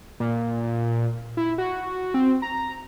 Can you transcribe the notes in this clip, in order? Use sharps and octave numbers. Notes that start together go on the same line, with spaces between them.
A#2
E4
F#4
C4
A#5